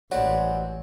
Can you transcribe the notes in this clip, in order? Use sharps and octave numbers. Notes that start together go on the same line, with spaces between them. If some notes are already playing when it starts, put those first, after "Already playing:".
A1 G3 G#3 C4 F#4 C#5